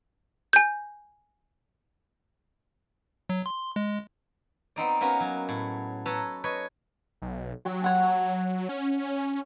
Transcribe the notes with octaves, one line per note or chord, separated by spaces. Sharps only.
G#5 G6
F#3
C6
G#3
B3 C4 D#4 D5
A#3 B3 C#4 F#4 A#4
F#3
A2
A4 B4 C#5 A5 A#5
B4 C#5 D#5
B1
F#3 G5 C#6
C#5 F#5 A5
C#4